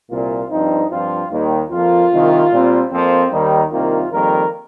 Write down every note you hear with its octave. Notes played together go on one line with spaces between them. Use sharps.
C2 A#2 A#3 F4
G2 F3 C4 D#4
G2 F3 C4 F4
D#2 D#3 G3 A#3
F2 F3 A#3 F4
C2 C3 D#3 A#3
A#2 G3 C4
F2 F3 A#3 C4
D#2 D#3 G3 A#3 D#4
C2 C3 D#3 A#3 F4
F2 D#3 G3 A#3 A#4